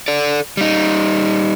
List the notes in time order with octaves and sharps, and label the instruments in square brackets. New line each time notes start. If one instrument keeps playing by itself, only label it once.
[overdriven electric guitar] A4 D5
G3 D#4